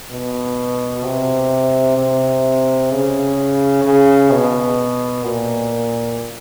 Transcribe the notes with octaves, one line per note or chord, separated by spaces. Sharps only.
B2
C3
C3
C#3
C#3
B2
A#2